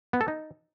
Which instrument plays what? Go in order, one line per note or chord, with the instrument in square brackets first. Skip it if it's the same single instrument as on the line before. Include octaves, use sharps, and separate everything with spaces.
[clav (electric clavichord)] B3
A4
D#4